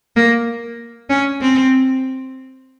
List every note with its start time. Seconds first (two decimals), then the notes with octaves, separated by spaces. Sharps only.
0.16 A#3
1.09 C#4
1.41 C4